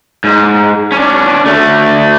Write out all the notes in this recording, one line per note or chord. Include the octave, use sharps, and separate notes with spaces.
G#2
C#4 D4
D3 A3